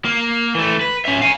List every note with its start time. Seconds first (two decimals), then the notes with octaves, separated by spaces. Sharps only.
0.05 A#3
0.55 E3 A3
0.81 B4
1.05 C#4 E5
1.21 F5 G#5